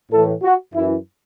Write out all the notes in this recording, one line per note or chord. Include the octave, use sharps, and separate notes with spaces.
A2 E3 A4
F#4
F#2 E3 E4